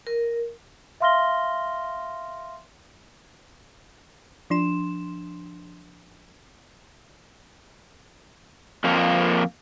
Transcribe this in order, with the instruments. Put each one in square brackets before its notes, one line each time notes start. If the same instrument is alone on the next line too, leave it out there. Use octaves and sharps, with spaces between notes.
[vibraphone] A#4
[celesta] E5 F5 C6 F6 A#6 G7
[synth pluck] F3 D4 C6 E7
[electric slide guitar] F2 F3 A#3